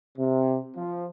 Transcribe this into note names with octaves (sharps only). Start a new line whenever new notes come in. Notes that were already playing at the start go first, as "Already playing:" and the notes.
C3
F3